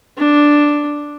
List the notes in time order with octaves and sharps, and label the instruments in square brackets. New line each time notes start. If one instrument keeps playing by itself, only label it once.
[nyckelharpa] D4